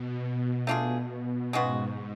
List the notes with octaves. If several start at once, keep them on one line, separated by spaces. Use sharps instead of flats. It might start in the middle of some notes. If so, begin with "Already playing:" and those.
Already playing: B2
B2
B2 A3 D4 F4 G#4
G#2 C#3 G#3 B3 F#4